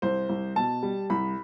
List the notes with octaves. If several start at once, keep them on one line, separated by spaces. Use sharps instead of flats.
C2 C5
C2
B2 A5
G3
C2 B5